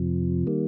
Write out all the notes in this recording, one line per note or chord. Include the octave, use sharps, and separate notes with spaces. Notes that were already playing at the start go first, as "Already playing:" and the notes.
Already playing: F2 C3 F3
D#3 G3 A#3